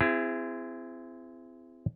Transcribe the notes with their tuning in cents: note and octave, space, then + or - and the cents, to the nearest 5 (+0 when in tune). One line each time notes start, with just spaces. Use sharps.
C4 -25 E4 +25 G#4 -20